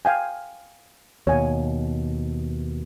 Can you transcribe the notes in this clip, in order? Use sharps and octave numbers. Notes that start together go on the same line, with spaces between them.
F5 G5 G#5
D#2 B2 C#5 G#5